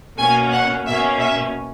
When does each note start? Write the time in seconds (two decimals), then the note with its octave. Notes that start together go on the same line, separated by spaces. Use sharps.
0.18 B2 A#3 C#4 G#5
0.52 F#5
0.86 B2 A#3 C#4 E5
1.20 E5